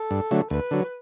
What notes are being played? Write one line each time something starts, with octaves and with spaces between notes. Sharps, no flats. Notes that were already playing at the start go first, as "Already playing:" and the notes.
Already playing: A4
G2
D3 F#3 A3
D2 B4
D3 F#3